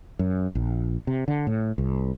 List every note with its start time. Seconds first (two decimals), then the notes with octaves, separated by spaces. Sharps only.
0.19 F#2
0.55 A#1
1.07 C3
1.28 D3
1.47 A2
1.78 C2